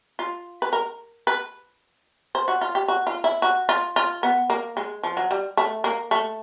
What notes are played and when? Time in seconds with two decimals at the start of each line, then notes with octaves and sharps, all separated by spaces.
0.19 F4
0.62 B4
0.73 A#4
1.27 B4
2.35 C5
2.48 F#4
2.61 F4
2.75 G4
2.88 F#4
3.07 F4
3.24 E4
3.42 F#4
3.69 F4
3.96 F4
4.23 B3
4.50 A#3
4.77 G#3
5.03 F3
5.17 F#3
5.31 G3
5.57 A3
5.84 A#3
6.11 A3